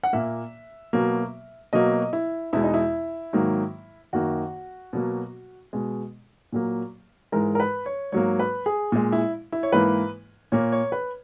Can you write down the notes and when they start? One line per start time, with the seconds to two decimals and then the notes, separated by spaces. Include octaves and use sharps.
0.04 F#5
0.13 A#2 A#3 E5
0.93 B2 F#3 A#3
1.73 B2 F#3 A#3 D#5
2.13 E4
2.53 E2 B2 G#3 E4
2.63 D#4
2.74 E4
3.33 G#2 D#3 F#3 A#3
4.13 F#2 D#3 A#3 F#4
4.93 B2 F#3 A#3
5.73 B2 G#3
6.52 A#2 F#3 A#3
7.32 G#2 E3 G#3 A#4
7.55 A#4
7.60 B4
7.86 C#5
8.12 G#2 F#3 A#3 C#5
8.39 B4
8.66 G#4
8.92 A#2 G#3
9.12 E4
9.52 E4
9.63 C#5
9.72 G#2 E3 A#3 B4
10.52 A#2 A#3 C#5
10.72 C#5
10.92 B4